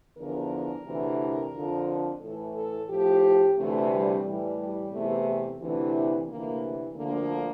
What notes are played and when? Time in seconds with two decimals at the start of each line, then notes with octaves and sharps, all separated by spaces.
0.17 E2 D3 F3 A#4
0.85 D2 C3 E3
1.53 F2 D3 F3
2.21 A2 E3 A4
2.55 A4
2.89 A2 F3 G4
3.57 D2 C3 E3 A3
3.91 G3
4.25 A2 E3 G3
4.59 G3
4.92 E2 C3 E3 A3
5.60 D2 C3 E3
6.28 D2 C3 E3 A#3
6.96 D2 D3 F3 A#3